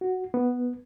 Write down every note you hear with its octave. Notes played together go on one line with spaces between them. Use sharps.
F#4
B3